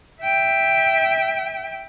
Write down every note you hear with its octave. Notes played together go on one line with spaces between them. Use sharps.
E5 G5